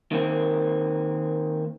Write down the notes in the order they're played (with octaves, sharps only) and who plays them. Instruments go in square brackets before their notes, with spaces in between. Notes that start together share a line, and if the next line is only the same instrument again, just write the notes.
[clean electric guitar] D#3 A#3 C4